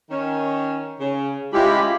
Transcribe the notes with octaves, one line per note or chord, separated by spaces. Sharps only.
D#3 C#4
C#3
G#3 C#4 E4 F4 G4 B5